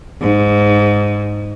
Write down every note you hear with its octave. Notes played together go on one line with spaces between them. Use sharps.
G#2